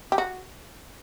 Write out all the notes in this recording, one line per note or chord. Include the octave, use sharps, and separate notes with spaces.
G4
F#4